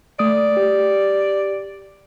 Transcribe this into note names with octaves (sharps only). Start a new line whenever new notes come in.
A3 D5 D#6
G4